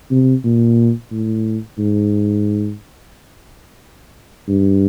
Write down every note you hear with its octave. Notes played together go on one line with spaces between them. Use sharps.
C3
A#2
A2
G#2
G2